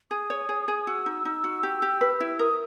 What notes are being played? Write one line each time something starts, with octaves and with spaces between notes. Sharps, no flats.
G#4 D#6
C#5
G#4
G#4
F#4 E6
D#4
D#4
F#4
G4
G4
B4
E4
A#4 D#6